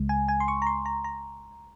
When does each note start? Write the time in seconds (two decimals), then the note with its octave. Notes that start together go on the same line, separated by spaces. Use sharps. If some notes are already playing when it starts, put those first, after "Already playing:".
Already playing: C#2 C#3 G#3
0.09 G#5
0.28 G#5
0.40 C6
0.48 C#6
0.62 A#5
0.67 C6
0.86 A#5
1.04 A#5